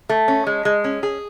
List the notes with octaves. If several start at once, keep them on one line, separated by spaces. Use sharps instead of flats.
A3
C#4
G#3
G#3
C#4
G#4